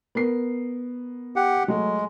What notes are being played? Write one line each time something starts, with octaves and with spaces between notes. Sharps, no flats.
B3 A#4 C7
G4 F#5
F#3 G#3 A3